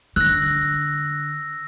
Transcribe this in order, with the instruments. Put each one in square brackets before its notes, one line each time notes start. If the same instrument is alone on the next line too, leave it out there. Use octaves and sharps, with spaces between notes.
[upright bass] D3 [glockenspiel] E6 A#6 [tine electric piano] F#6